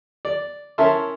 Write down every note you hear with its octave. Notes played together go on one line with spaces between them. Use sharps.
D5
C#4 E4 A#4 E5 A5 C6